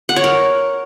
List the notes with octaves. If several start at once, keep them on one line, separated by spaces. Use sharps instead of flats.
F#5
C#5
A#4